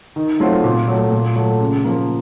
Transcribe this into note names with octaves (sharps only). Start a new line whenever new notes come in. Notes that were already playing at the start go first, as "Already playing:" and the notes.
D#3
F#3 A3 C4 F4
A#2
F#3 A3
A#2
F#3 A3
C#3
F3 A#3